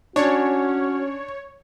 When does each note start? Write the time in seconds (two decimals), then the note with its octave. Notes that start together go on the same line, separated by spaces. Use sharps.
0.16 C#4 D4 F#4 C#5